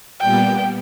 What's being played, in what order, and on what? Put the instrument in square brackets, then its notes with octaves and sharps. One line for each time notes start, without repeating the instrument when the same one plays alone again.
[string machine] A#2 G3 B3 [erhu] G5